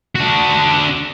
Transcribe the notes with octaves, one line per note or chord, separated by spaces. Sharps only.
D4 F#4